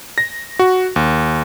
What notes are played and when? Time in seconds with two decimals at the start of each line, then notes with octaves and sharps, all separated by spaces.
0.18 A#6
0.59 F#4
0.96 D#2